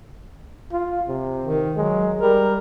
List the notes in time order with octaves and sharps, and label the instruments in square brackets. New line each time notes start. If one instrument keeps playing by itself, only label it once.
[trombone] F4
C3
[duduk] D#3
[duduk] F#3 [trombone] G#3
[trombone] G3 [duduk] A#4